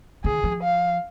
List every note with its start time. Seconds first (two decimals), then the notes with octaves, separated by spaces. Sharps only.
0.24 D#3 G#4
0.44 F3
0.63 F5